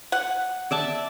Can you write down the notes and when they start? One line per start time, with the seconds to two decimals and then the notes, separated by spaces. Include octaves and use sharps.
0.12 F#5
0.71 D5 E5 A5